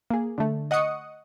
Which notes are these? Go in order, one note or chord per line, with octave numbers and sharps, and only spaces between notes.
A#3 G#4
D3 A3
D#5 F#5 C#6 D#6 C#7